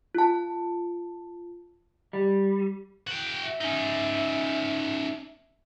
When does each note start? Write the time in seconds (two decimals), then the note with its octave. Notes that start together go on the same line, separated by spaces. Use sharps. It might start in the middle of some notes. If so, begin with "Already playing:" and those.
0.15 F4 A5
2.13 G3
3.07 F#4 G5
3.43 E5
3.61 C#4 D#4